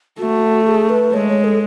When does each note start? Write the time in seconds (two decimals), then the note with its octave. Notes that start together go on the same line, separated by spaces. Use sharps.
0.19 A3 F#4
0.66 G#4
0.89 B4
1.13 G#3 C#5
1.29 C#5
1.44 A4